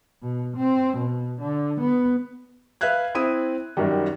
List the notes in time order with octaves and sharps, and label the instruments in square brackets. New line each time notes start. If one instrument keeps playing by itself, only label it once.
[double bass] B2
C4
B2
D3
B3
[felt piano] B4 E5 F5 F#6 G#6
C4 E4 D#6 D#7
F#2 D#3 F#3 G3